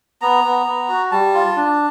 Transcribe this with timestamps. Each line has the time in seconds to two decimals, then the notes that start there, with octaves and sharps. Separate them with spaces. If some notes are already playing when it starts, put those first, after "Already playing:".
0.21 B3 A#5
0.44 B3
0.66 B3
0.88 F#4
1.11 G3 A5
1.34 F4
1.56 D4